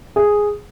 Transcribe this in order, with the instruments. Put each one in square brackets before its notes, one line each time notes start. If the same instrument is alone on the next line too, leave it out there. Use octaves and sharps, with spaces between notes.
[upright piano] G#4